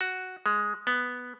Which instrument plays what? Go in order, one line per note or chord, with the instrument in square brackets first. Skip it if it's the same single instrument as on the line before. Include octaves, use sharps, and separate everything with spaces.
[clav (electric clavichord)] F#4
G#3
B3